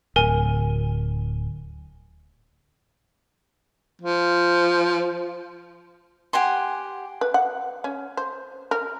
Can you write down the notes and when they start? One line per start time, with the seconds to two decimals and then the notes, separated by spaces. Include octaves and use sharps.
0.16 D1 A#4 G#5
4.02 F3
6.33 G4 F#5 G#5 C6
7.21 B4
7.34 F#5
7.84 C#4
8.17 C5
8.71 A#4